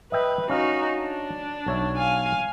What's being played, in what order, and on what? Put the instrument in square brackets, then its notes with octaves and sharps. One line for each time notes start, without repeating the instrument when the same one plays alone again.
[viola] B4 [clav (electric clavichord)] D#5 E5 G5
[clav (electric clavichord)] C#4 F5 [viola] D#4 F#4
[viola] D4
[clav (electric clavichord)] B1 C#5 E5
[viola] F5 G#5